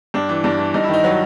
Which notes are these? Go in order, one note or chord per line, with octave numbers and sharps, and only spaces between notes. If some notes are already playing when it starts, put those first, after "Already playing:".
G2 D4
E3
G2 D4
E3
G2 D#4
E4
D#3 D#4
F#3